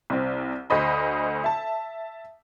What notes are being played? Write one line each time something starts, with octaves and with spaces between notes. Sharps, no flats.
C2 C4
D2 C5 D#5 B5
E5 A5